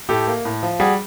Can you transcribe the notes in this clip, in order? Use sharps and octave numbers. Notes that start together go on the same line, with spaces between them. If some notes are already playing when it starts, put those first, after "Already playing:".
A2 G4 A4
A#3
A2
F3
G3 F#4 G#4